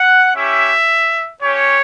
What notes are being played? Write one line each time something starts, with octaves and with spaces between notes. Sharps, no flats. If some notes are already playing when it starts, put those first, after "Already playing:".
Already playing: F#5
C#4 E4 G4 E5
C#4 G4 C#5